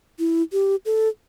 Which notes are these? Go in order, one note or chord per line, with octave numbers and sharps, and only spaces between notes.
E4
G4
A4